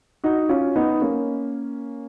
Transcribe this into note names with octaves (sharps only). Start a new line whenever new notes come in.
D#4 F#4
C#4 F4
B3 D#4
A#3 C#4